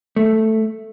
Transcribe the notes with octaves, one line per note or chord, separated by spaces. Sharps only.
A3